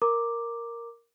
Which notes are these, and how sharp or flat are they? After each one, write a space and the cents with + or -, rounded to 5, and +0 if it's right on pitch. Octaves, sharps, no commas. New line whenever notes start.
A#4 +0 A#5 +0 D6 +0